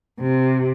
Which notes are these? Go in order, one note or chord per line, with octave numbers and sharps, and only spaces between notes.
C3